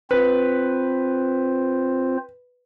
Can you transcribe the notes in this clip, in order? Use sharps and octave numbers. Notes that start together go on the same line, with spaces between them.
C4 F4 B4 C5